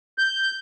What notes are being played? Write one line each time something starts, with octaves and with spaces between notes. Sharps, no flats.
G6